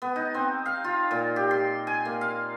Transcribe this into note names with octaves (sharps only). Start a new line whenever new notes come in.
B3
D#4
C4
F5
F4
A#2
G4
C6
G#5
A#3
F5